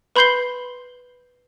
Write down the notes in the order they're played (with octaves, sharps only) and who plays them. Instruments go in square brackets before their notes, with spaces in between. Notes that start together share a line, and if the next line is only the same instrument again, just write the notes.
[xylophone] B4 B5 C6 G6 C7 G7